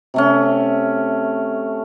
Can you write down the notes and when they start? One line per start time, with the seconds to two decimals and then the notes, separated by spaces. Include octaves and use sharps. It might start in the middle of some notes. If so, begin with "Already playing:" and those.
0.14 C3 A3 C#4